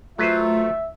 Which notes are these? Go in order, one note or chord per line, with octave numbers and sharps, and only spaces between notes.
F#3 A3 F4 B4 C5 E5